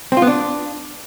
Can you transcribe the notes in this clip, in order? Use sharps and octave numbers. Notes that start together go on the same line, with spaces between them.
C4
F4
B3
D4